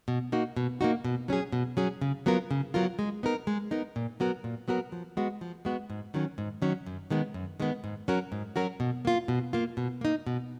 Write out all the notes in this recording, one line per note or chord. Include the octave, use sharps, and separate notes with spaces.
B2
A#3 D#4 F#4
B2
A#3 D#4 F#4
B2
F#3 C#4 G#4
B2
F#3 C#4 G#4
C#3
F#3 B3 F4 A#4
C#3
F#3 B3 F4 A#4
G#3
B3 D#4 A#4
G#3
B3 D#4 A#4
A#2
F#3 B3 F#4 A#4
A#2
F#3 B3 F#4 A#4
F3
G#3 B3 F#4
F3
G#3 B3 F#4
G#2
D#3 F#3 C#4
G#2
D#3 F#3 C#4
F#2
D#3 G#3 B3
F#2
D#3 G#3 B3
G#2
F#3 C#4 F#4 A#4
G#2
F#3 C#4 F#4 A#4
B2
A#3 F4
B2
A#3 F4
B2
A#3 D#4
B2